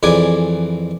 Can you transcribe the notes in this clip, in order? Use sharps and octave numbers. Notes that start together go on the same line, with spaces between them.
F2 E3 G#4 D5 G#5